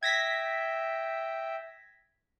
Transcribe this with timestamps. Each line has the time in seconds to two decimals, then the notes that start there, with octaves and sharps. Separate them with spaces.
0.03 E5 G5 G#6 A#6 B6